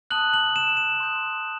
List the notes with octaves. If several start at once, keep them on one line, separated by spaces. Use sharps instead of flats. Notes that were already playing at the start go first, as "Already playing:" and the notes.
A5 D#6 F#6 F#7
F#7
E7
E7
C6 D#6 G6